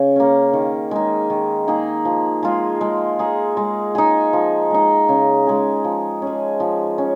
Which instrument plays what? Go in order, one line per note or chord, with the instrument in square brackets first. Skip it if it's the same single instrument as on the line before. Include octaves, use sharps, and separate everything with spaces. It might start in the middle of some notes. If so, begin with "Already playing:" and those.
Already playing: [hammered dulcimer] C#3
A#3 C#4
D#3
G#3 D#4
D#3
A#3 D#4 G#4
F3
G#3 F4 G#4
G#3
D#4 G#4
G#3
D#4 G#4
F3
G#3 D#4
C#3
G#3 D#4 G#4
F3
C#4 G#4
F3
C#4